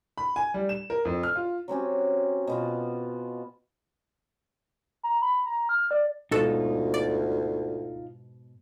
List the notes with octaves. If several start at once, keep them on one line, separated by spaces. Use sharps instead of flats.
B5
G#5
G3
E7
A#4
F2
F6
F4
F#3 C4 C#4 G4
B2 B3 F4
A#5
B5
A#5
F6
D5
D2 G#2 B2 G#3 D#4 F4 F#4 A4
D5